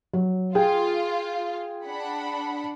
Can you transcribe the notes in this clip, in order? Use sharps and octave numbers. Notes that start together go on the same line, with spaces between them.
F#3
F4 G#4 G5
D4 F#5 B5